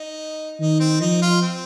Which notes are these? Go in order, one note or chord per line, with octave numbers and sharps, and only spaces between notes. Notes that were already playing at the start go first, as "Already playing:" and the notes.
Already playing: D#4
D#3 D#4
C4
F3 D#4
F4
C4